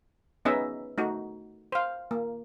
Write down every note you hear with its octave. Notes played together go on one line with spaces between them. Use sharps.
B3 C#4 D#4 G#4 D#5 E5
A3 D#4 F#4
C5 F5
A#3